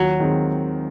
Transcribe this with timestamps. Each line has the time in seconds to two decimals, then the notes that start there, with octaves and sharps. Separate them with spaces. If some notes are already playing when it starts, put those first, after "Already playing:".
Already playing: D#2 F#3
0.20 D#3 G#3 C4